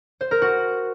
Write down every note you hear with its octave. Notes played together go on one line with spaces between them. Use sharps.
C5
A#4
F#4